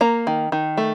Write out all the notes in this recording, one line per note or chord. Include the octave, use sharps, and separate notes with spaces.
A#3 A#5
D#3
D#3
A3